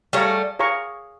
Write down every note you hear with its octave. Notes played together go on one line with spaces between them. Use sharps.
G3 A3 G#4 C#5 F5 A#5 C#6
G#4 C#5 F5 A#5 C#6